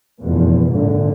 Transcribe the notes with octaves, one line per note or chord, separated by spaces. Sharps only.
F1 A#1 E2 B2
G#1 F#2 A#2 D3